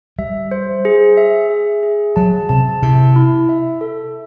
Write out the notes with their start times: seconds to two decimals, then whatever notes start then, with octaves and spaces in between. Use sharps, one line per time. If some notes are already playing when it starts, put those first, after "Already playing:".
0.19 G3 E5
0.51 C5
0.85 G#4
1.17 E5
1.50 G#4
1.83 G#4
2.16 F#3 A5
2.49 C3 A5
2.82 C3 E4
3.16 E4
3.49 E5
3.81 A4